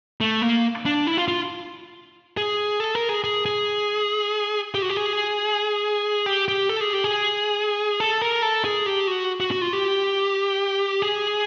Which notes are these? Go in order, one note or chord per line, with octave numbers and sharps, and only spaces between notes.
A3
A#3
D4
E4
F4
F4
G#4
A4
A#4
G#4
G#4
G#4
G4
F#4
G4
G#4
G4
G4
A4
G#4
G4
G#4
A4
A#4
A4
G#4
G4
F#4
F#4
F#4
F4
G4
G#4